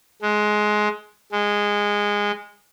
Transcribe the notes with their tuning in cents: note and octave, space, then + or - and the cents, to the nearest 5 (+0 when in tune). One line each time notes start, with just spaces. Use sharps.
G#3 +15
G#3 -15